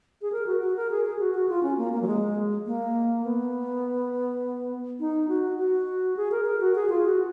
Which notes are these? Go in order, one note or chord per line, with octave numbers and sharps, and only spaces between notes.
G#4
A#4
F#4
F#4
A#4
G#4
G#4
F#4
F#4
F4
C#4
A#3
A#3
F#3
G#3
A#3
B3
D#4
F#4
F#4
G#4
A#4
A#4
F#4
G#4
F4
F#4